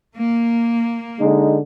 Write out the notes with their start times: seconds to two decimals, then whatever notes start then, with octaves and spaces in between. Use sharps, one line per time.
0.15 A#3
1.20 D3 G#3 D#4